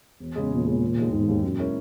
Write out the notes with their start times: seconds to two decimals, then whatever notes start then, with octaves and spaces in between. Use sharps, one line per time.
0.20 E1
0.35 E2 C#3 G#3
0.51 E1 A#2
0.66 E2 C#3 G#3
0.82 E1
0.97 D#2 D#3 G#3
1.12 E1 G#2
1.28 D#2 D#3 G#3
1.43 F#2 A#2
1.58 G#3 C#4 E4 A#4